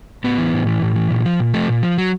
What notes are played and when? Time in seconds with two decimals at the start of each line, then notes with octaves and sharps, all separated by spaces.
0.24 A2 B3
0.38 E3
0.53 A2
0.67 E3
0.82 A2
0.96 E3
1.11 A#2
1.25 F3
1.40 A#2
1.54 F3 A3
1.68 A#2
1.83 F3
1.98 F#3